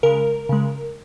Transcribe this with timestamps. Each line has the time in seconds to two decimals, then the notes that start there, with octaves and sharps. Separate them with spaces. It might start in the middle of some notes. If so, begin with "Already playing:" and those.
0.03 C#3 G#3 A#4
0.49 C#3 G#3